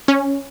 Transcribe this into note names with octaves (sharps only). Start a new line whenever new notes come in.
C#4